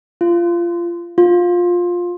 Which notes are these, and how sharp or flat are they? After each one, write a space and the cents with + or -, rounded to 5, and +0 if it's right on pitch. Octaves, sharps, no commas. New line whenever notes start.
F4 -20
F4 +15